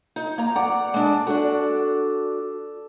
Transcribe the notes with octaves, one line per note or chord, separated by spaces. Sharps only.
D#4
A#3 A#5
D5 F#5
G#3 D4
D4 F#4 A4